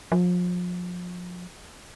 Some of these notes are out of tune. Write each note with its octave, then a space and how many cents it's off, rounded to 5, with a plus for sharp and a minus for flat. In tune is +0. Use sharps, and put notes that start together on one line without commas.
F3 +35